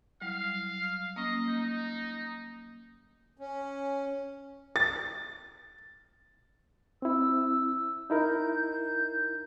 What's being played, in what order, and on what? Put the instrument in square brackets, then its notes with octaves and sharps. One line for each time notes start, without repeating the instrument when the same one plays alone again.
[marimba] F#3 G3 E4 [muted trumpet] F5
[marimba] A#3 C#4 [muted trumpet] D#5
[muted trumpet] D#4
[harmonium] C#4
[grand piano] A6
[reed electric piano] C4 E4 [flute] E6
[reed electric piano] D#4 E4 A#4 [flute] G6